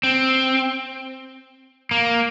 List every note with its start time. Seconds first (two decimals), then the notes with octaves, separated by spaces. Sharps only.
0.03 C4
1.91 A#3